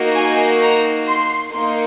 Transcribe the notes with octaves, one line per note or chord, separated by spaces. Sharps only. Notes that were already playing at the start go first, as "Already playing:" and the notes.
Already playing: A#3 D#4 F#4
G#5
A#5
C6
A#3 D#4 C6